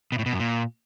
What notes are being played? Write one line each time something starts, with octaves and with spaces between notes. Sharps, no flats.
B2
A2
B2
F#2
A#2